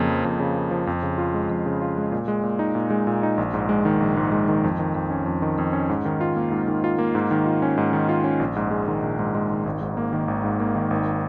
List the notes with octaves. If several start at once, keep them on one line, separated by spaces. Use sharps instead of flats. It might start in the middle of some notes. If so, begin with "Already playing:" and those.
Already playing: F2 C#3 A#3
F3
F2
C#3
A#3
F3
F2
C#3
F4
G#3
F2
C#3
F4
G#3
A#2
G#3
A#2
D#4
A#2
G#3
A#2
D#4
A#1
G#2
G#3
D#3
A#1
G#2
G#3
D#3
F2
D#3
F2
C#4
F2
D#3
F2
C#4
G#2
D#3
F4
A#3
G#2
D#3
F4
A#3
G#2
D#3
F4
C#4
G#2
D#3
F4
C#4
A#1
G#2
G#3
D#3
A#1
G#2
G#3
D#3
G#1
G#2
A#3
D#3
G#1
G#2
A#3
D#3
G#1